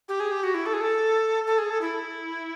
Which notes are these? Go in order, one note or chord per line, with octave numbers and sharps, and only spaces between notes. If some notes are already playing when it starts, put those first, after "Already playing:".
G4
G#4
G4
F#4
E4
A4
G#4
A4
A4
G#4
A4
E4